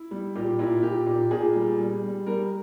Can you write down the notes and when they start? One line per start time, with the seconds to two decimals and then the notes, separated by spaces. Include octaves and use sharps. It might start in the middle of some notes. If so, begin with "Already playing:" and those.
Already playing: E4
0.11 G3
0.36 A#2 G4
0.59 A#2 E4
0.83 A#2 G4
1.06 A#2
1.31 A#2 G#4
1.55 G3
1.79 G3
2.03 G3
2.26 G3 A#4